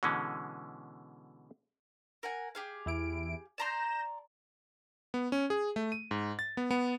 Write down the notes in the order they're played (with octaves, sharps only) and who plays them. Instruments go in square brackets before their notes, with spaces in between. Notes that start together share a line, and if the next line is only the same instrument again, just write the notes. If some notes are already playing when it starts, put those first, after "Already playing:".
[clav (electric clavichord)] B2 D3 E3 G#3 C#4
[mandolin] A#4 F#5 G#5
G4 G#4 F5
[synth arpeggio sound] E2 E4 D7
[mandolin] D5 A#5 C6 [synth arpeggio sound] G6 A#6 E7
[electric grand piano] B3
C#4
G#4
A3
D#7
G#2
A6
B3
B3